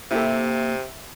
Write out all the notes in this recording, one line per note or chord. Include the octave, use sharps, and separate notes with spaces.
C3 A#3 E4 G4 A4